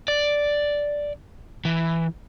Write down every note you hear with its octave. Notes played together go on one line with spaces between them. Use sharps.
D5
E3